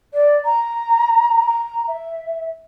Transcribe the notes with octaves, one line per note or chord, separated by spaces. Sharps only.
D5
A#5
A#5
E5